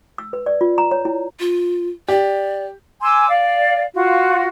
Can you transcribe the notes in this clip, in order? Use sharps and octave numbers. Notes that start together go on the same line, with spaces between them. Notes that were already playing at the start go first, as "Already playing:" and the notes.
E6
B4
D5
F4
A#5
C#5
E4
F4
G4 D5
G#5 C6 D6 E6
D5 F5
F4 F#4